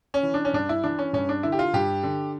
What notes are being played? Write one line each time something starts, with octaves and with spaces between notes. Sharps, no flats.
C#4
E3
D4
C#4
G2 D4
E4
E3 D4
C#4
G2 C#4
D4
D3 E4
G4
F4
G2 G4
D3